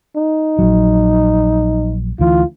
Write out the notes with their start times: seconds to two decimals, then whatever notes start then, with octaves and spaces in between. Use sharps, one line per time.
0.16 D#4
0.59 A#1 F#3
2.19 D2 E3 F4